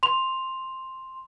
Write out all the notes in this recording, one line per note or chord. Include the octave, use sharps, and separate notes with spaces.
C6 F7